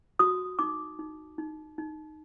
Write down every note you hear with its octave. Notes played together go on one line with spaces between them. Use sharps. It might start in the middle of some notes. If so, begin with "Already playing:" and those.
F#4 D#6
D#4 D6
D#4
D#4
D#4